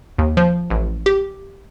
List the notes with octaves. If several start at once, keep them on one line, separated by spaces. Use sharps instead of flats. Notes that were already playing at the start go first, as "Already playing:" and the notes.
D#2
F3
A1
G4